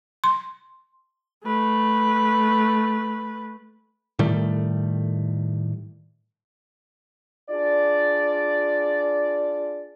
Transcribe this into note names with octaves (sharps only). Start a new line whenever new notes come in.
C6
A3 B4
A2 D#3 G3 A3
D4 F4 G#4 D5